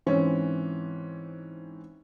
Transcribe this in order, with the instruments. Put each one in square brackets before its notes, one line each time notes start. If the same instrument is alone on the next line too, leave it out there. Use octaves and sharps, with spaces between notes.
[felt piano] G#2 E3 C4 C#4